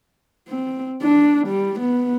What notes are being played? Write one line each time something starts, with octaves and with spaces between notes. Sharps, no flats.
C4
D4
G3
B3